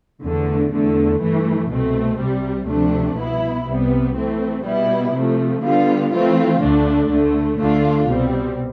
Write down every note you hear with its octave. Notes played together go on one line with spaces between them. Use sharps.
E2 D3 A3
E2 D3 A3
G2 E3 A3
C2 B2 A3 C4
C2 C3 G3
D2 C3 F3 A3 D4
C2 B2 B3 E4
C2 C3 G3 B3
E3 A3 C4
B2 G3 B3 E4
C3 F3 A3
D3 G3 B3 F4
E3 A3 C4 F4
D2 D3 A3 D4
D2 D3 A3
D2 D3 A3 D4 F4
C2 B2 G3 C4